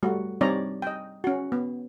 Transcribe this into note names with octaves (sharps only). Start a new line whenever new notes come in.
G3 A3 F#4
G3 C4 D#4 C#5 D5 A#5
D#5 G5
C#4 F#4
B3